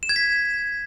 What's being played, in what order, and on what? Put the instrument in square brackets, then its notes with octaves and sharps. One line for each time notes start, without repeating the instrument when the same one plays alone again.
[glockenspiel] E7
G#6
B6